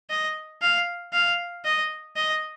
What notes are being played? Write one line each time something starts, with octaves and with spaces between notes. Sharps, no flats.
D#5
F5
F5
D#5
D#5